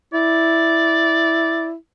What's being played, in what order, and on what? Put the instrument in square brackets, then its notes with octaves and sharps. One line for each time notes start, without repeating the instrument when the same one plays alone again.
[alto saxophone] E4 [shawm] D5